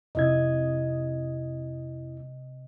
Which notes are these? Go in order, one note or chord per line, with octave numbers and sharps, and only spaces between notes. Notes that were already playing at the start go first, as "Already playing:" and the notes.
F2 C3 E4 D#5 G#6